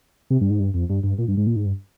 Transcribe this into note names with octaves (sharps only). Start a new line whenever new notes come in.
C3
G2
G#2
G2
F2
G2
G2
A#2
G2
G#2
A#2
G#2
G2